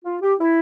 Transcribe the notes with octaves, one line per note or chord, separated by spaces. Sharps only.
F4
G4
E4